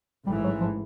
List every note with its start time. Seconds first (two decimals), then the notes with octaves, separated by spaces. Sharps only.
0.25 A1 G#2 E3 G3
0.44 F#3
0.60 F3